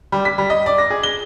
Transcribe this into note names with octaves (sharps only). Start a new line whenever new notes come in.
G3
B6
G3
D#5
D5
A#6
G#4
G7